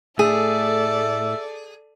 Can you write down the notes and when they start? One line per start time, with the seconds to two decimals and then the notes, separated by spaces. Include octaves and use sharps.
0.19 A2 A3 G#4 A4 D5 E5